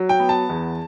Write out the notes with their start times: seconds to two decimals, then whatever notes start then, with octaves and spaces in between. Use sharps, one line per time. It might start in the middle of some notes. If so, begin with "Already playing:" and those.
Already playing: F#3
0.09 G5
0.20 B3
0.29 A5
0.49 E2